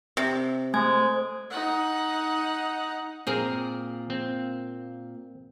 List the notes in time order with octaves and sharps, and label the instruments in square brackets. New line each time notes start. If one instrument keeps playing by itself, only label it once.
[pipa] C3
[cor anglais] G#3 [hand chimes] A3 G#5 G#6 [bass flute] C5
[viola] D#4 F#5
[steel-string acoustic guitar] A#2 A#3 [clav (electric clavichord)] C4 G#4 A#4
[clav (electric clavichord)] C4